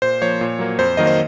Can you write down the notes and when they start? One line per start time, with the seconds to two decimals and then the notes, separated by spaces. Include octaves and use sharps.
0.02 A#2 C5
0.21 F3 A#3 C#5
0.41 A#2
0.59 F#3 A#3
0.78 F2 C5
0.97 D#3 F#3 A#3 D#5
1.07 C5